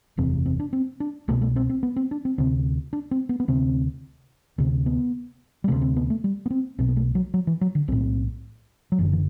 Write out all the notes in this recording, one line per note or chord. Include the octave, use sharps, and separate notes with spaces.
F#1 E2 C3 C4
C4
D4
C4
D4
C2 B2 A3
A3
C4
C4
B3
C4
D4
C4
D2 C3 C4
D4
C4
B3
B3
D2 C3 C4
D2 C3 C4
B3
G3
D2 C3 A3
C4
B3
A3
G3
B3
C4
B1 B2 C4
B3
A3
F#3
F#3
E3
F#3
D3
B1 A2 C4
F#3
F#1 F#2 D3 E3
E3